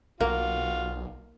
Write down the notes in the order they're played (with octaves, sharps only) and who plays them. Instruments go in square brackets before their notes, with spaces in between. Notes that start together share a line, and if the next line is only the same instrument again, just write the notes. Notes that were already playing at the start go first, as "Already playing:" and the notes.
[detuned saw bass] B1 [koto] A#3 [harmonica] F4 F#4